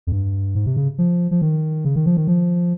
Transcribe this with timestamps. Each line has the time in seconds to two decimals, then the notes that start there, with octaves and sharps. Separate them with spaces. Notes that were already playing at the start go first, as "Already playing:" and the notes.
0.07 F2
0.12 G2
0.55 G#2
0.66 C3
0.77 C#3
0.98 F3
1.31 F3
1.42 D#3
1.85 C#3
1.96 D#3
2.06 F3
2.17 D#3
2.28 F3